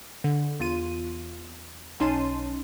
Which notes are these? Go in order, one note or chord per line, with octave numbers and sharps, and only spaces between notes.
D3
E2 F4 D#7
B1 C#4 D#4 A5 C6 D#7